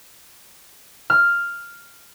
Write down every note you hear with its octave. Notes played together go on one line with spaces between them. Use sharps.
F6